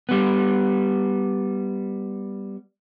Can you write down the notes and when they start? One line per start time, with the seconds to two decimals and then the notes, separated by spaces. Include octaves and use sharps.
0.09 G3 B3